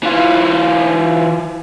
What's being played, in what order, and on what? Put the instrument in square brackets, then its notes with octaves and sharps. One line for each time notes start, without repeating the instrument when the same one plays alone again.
[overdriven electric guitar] E3 F4